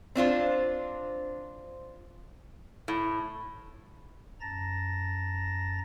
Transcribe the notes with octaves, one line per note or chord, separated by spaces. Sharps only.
C4 D4 F4 C5
A2
F#2 A5 A#5 A6 A#6